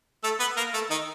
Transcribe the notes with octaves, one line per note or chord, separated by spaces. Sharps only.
A3 A4
B3 B4
A#3 A#4
A3 A4
D#3 D#4